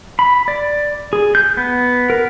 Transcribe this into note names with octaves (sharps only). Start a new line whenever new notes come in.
B5
D5
G#4
G6
B3
A#4